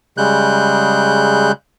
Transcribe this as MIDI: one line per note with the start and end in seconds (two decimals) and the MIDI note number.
0.18 1.52 49
0.18 1.52 55
0.18 1.52 56
0.18 1.52 90
0.18 1.52 91